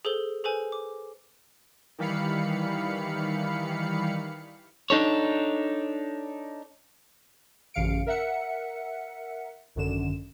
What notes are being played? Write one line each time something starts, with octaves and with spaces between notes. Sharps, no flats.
G#4 A4 C5 G7
G#4 A4 B4 C5 G#5
D6
D#3 E3 G3 F5 B5 C#7
D4 D#4 A4 C#5
A1 F#2 C#3 F5 C#7 D7
A#4 E5 F#5 C#7
G#1 F#2 D3 E7